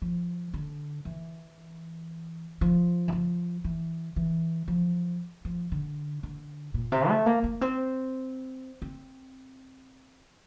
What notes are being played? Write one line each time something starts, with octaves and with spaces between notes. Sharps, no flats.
F3
D3
E3
F3
E3
F3
E3
E3
F3
F3
D3
D3
A#2
C3
A3
A#3
A#3
C4
C4